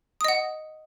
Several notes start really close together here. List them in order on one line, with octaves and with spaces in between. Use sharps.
D#6 D#5 F#5